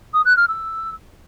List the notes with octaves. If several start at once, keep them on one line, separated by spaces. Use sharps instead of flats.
D#6
F#6
F6
E6